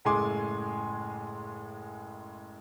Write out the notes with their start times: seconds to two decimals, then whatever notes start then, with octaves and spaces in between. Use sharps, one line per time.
0.05 F#1 A2 G#3 G#5 C6 D6